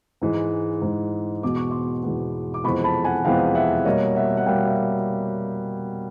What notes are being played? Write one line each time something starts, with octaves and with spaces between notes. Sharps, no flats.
G#2 E3 G#3
G#2 E3 G#3
E2 B2 G#3 B3 D6
C#6
C6 D6
E2 B2 G#3 B3
D6
F2 C3 E3 G#3 B3 B5 C#6
A5 B5
F#5 G#5
F2 C3 E3 G#3 B3 F5 G5
E5 F#5
B2 G3 A#3 C#5 D#5
E5 F#5
F#5
B2 G3 A#3 F5 G5
E5 F#5